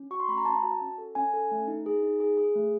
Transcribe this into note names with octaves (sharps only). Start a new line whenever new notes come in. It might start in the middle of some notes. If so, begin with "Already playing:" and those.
Already playing: C#4
F#4 C#6
C6
A3 B5
A#5
C#4 A5
F#4
C#4
A4
C#4 G#5
A4
A3
D#4
G#4
D#4
G#4
G#4
A3